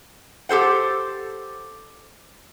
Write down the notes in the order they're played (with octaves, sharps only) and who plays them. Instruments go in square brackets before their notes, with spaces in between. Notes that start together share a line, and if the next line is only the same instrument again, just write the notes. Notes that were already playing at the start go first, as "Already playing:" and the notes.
[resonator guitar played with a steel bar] G4 A4 C5 F#5